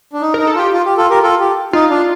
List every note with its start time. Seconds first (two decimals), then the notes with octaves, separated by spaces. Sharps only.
0.13 D4
0.21 D#4
0.34 D#4 A#4
0.47 A4
0.55 F4 G4
0.73 F4
0.85 G4
0.98 F4 A4
1.10 G4 A#4
1.23 F4 A4
1.40 G4
1.73 D#4 F4
1.90 D4